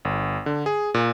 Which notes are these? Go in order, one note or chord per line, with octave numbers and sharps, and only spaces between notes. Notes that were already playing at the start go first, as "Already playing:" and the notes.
G1
D3
G#4
A#2